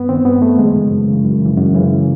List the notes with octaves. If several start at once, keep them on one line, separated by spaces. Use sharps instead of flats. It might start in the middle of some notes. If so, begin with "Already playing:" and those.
Already playing: G2 B3
D#3 C4
G2 B3
D#3 A3
F#2 G#3
C#3 E3
F#2
C#3 E3
F#2
C#3 E3
F#2
C#3 E3